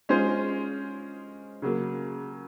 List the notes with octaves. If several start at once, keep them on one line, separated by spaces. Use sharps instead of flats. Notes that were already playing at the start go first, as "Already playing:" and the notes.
G#3 C#4 F4 G#4 C5
C#3 F#3 A#3